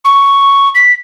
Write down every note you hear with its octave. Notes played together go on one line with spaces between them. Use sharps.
C#6
B6